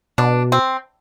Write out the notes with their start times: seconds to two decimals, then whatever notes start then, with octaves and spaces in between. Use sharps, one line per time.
0.18 B2 D4
0.52 C4